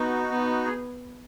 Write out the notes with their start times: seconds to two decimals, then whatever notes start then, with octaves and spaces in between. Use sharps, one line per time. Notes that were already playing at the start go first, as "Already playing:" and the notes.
Already playing: B3 D#4 F#4
0.31 B3
0.64 G#4